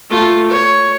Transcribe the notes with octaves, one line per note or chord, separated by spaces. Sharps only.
A3 F4
C#5